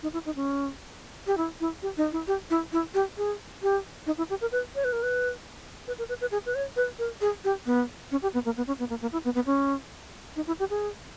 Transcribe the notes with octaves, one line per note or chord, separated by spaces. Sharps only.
D#4
E4
D#4
C#4
G4
E4
E4
G4
D#4
E4
G4
E4
E4
G4
G#4
G4
D#4
E4
G4
A#4
B4
C#5
B4
A#4
B4
B4
A#4
B4
B4
G#4
B4
C#5
B4
A#4
G#4
G4
B3
C#4
G4
B3
A#3
B3
C#4
B3
A#3
A#3
E4
B3
B3
C#4
D#4
E4
G4
G#4